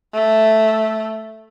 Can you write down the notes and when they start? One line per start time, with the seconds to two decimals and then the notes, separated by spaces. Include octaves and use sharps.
0.14 A3